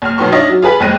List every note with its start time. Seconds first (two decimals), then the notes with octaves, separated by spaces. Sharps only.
0.02 F#1 F6
0.18 F#2 B2 D#3 B3 C6 C#6
0.32 D4 D#4 F4 C#5 D#5 E5
0.49 F#3
0.62 F4 G#4 B4 B5
0.80 F#1 F2 G#3 C4 F#6 D#7